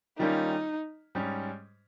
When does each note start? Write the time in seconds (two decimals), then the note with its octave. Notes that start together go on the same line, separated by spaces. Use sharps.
0.19 D#3 G3 A#3 C#4 D#4 F4
1.15 G#2 G3 C#4